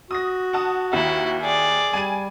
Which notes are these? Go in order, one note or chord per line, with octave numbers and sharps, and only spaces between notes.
F#4 D#6 A#6
F#5 A5 D#6
D#2 E4
G#4 D5
G3 G#5 D#7